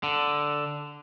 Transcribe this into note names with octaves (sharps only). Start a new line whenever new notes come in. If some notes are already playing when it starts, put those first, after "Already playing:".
D3